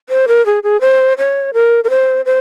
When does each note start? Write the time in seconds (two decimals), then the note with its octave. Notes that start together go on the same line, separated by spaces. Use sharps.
0.09 C5
0.28 A#4
0.46 G#4
0.63 G#4
0.81 C5
1.18 C#5
1.54 A#4
1.84 A#4
1.90 C5
2.25 C5